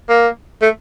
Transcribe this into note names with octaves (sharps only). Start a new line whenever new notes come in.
A#3
A3